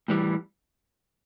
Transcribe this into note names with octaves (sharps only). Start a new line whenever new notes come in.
A2 E3 G3